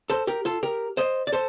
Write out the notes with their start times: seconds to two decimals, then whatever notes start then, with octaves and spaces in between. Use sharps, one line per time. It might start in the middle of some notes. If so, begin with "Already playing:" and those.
0.10 A4 C5
0.27 G4 A#4
0.45 F4 A4
0.63 G4 A#4
0.97 C5 D#5
1.27 D5
1.33 A4 C5